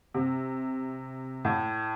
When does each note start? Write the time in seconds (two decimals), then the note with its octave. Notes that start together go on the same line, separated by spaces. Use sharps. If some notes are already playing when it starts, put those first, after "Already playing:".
0.14 C3
1.45 A2